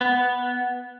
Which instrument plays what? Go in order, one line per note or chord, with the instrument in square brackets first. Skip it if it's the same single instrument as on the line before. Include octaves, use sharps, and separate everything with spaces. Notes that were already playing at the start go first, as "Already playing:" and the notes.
[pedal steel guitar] B3